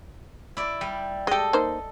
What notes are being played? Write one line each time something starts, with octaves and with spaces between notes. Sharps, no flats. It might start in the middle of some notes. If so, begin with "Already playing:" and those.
E4 D5
G3
G#3 G4 A4 D#5
A#3 D#4 C5